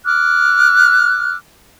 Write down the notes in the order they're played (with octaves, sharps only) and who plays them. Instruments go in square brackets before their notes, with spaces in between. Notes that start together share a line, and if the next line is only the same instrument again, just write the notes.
[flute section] D6 F6 F#6